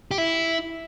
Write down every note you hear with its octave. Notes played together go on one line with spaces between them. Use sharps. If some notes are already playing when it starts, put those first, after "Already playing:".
G4
E4